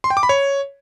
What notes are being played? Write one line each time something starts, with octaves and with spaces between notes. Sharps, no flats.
C6
G5
D6
B5
C#5